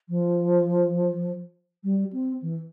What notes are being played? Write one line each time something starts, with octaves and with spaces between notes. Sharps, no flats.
F3
G3
C4
E3